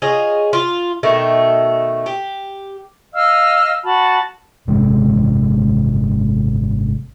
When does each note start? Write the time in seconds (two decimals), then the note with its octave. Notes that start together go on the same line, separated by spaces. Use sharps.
0.02 F4 G#4 C#5 D#5
0.53 F4
1.03 B2 D#3 A3
2.06 G4
3.14 D#5 F5 E6 F6
3.84 F#4 A5 B5
4.67 G#1 F#2 C3 G#3